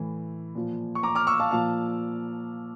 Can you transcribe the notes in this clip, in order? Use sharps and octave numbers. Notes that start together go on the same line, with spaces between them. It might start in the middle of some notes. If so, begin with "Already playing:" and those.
Already playing: A2 E3
A#2 F3
C#6
A#5 D6
D6 F6
C#6 E6
F5 A5
A#2 F3 F5 A5